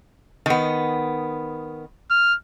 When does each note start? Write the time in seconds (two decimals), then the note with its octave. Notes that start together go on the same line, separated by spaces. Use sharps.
0.46 D#3 B3
2.11 F6